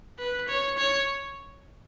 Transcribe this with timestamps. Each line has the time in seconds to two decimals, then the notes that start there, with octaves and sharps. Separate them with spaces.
0.19 B4
0.48 C#5
0.78 C#5